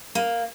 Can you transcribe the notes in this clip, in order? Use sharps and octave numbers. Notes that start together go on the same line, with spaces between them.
A#3